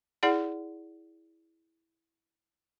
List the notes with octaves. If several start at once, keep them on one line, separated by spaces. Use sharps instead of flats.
E4 G#4 D5 F#5